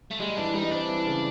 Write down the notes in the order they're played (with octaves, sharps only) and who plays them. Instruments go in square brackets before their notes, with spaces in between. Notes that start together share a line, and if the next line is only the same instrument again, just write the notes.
[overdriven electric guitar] A3
[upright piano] G3 [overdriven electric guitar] G#3
[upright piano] E3 [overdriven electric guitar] D4
[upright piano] G3 [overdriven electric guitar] D#4
[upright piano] C4 [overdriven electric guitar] D4
[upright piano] E3
C#3